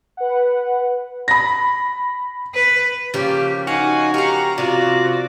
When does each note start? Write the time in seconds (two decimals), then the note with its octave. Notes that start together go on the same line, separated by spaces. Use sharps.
0.17 B4 F#5
1.28 B5 A#6
2.55 B4
3.14 C#3 F3 A#3 G4
3.67 D#4 F#4 F5 G#5
4.14 G4 A#4 F5 A#5
4.58 C3 F4 F#4 D5